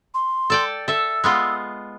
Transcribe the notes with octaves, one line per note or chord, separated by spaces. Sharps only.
C6
A4 D5 G5
A4 E5 E6
G#3 B3 F4